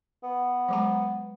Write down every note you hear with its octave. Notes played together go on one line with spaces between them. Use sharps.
B3
F#3 G#3 A#5